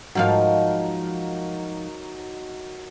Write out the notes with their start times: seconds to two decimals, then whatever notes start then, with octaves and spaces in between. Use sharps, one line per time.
0.15 G#2 F3 F#3 D#4 A#4 F5